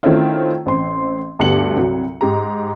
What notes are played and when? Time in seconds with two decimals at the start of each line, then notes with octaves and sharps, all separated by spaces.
0.03 D#3 A3 C4 C#4 E4 F4
0.66 A1 C4 C6
1.39 D2 G2 B3 G4 C#7 F#7
1.77 C2 F#3
2.21 G#2 G4 A#5